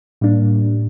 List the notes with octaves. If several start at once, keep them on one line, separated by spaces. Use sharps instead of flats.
A2 G3 A#3 D4